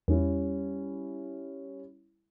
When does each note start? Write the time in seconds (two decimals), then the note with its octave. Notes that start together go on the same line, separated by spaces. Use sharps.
0.08 E2 G3 C#4 E4